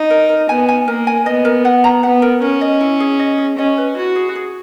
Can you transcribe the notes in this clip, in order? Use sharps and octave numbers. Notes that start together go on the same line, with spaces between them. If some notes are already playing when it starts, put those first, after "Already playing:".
Already playing: D#4
A#4
A#4
B3 G#5
G#5
A#3 A#4
G#5
B3 D#5
A#4
F#5
A#5
B3 F#5
A#4
C#4 A#4
D#5
E4
G#4
D#5
G#4
C#4 D#5
B4
E4 F#4
G#4
G#4